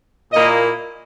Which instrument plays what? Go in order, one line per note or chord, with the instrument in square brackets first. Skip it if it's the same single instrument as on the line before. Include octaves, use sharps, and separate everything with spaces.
[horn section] A#2 A#3 E4 D#5